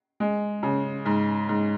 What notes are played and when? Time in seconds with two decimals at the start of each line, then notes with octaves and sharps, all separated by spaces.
0.20 G#3
0.63 C#3
1.05 G#2
1.49 G#2